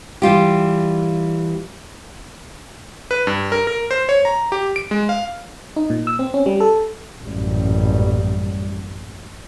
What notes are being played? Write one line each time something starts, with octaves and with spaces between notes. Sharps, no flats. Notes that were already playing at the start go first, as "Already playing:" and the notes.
E3 G3 F4 G4
B4
G2
A#4
A#4
C5
C#5
A#5
G4
D7
G#3
F5
D#4
A#2
E6
C4
C#4
G3
A4
A1 F#2 A#2 G3